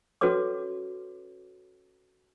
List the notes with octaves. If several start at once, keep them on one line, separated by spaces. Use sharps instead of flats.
C#4 F#4 A4 B4 C#5 D6